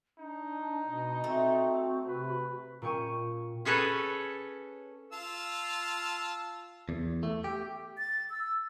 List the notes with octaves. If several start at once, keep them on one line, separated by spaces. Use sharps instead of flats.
D4 D#4
B2 D#5
A3 C4 F#4
C3 B4
A#2 C#4 G5 C#6 D#7
C#4 G#4 A4 B4 C#5
F4 A5 E6
E2
A3
G4
A6
E6